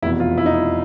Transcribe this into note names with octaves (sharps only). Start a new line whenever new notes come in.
F1 E2 B2 E4
F4
E4
D#4
E4